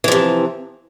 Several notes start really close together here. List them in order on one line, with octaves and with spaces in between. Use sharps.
E3 F3 C3